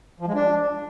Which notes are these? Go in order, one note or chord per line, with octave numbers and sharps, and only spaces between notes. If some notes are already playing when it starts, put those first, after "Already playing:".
F3
G#3
D4